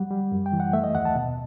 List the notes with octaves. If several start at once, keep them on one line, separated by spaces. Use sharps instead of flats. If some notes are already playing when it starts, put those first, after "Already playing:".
Already playing: F#3 G3 F#5
G3
F#2
G5
E3
F#5
A3 E5
D#5
D#2 F#5
A5
B2